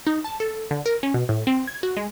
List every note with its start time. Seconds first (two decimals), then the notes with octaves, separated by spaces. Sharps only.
0.07 D#4
0.24 A5
0.40 A4
0.71 D3
0.86 A#4
1.03 C#4
1.14 B2
1.29 A2
1.47 C4
1.68 G#6
1.83 F#4
1.97 G#3